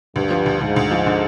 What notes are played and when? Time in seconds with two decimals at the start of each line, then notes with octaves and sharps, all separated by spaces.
0.16 D2 G2
0.31 F3
0.46 D2
0.61 D2 G#2
0.76 D2
0.91 F3
1.06 D3